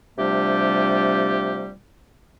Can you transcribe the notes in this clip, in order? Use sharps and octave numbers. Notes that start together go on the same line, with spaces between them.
C3 F3 G3 A3 D4 G4